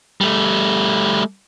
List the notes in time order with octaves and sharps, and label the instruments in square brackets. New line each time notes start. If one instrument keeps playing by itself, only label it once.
[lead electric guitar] G3 A3